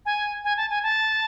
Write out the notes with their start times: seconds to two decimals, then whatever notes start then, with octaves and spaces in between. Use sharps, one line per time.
0.06 G#5
0.44 G#5
0.57 A5
0.70 G#5
0.83 A5